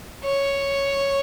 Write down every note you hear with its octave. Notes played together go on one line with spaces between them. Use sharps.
C#5